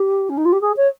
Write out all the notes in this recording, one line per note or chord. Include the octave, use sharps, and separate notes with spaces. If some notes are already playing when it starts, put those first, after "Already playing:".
Already playing: G4
C#4
D#4
F4
G4
G#4
C#5